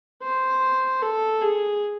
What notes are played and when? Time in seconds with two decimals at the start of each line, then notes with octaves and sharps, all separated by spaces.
0.23 C5
1.02 A4
1.41 G#4